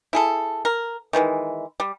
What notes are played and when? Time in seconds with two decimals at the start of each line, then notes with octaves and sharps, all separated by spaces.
0.13 E4 G#4 A4
0.65 A#4
1.13 D#3 E3 F#3 G#3
1.80 G3